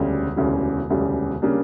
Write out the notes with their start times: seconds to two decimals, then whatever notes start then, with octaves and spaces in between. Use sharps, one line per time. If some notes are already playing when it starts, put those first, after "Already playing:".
Already playing: E1 D2 C#3 G3
0.36 E1 D2 C#3 G3
0.89 E1 D2 C#3 G3
1.42 C#3 G3 A#3 D4